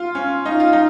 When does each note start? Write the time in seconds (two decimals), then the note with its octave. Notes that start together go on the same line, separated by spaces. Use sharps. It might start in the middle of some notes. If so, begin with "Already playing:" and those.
Already playing: F4
0.15 C#4
0.45 D#4
0.60 F4
0.73 D#4